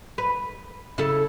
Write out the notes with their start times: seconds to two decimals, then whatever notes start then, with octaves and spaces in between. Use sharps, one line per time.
0.18 B4
0.98 C#3 E4 A4